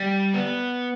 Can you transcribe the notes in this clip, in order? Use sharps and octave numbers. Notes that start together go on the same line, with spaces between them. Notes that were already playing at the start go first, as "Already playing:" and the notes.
Already playing: G3
B3